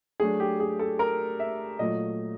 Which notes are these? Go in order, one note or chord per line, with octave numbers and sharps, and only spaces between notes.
F#3 A3 D4 G#4
G4
G#4
A4
A#4
E5
A#2 F#3 A3 D#5